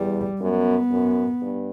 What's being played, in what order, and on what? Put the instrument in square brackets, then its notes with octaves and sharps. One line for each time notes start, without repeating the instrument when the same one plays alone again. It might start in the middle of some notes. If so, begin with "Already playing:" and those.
Already playing: [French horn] E2 [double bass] G3
[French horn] F#2 [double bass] B3
[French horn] F#2
G2